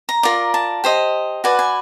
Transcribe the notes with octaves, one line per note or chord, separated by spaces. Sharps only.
A#5
F4 A#4 D5
A5
G4 C5 D#5
F#4 B4 D5 G#5
G#5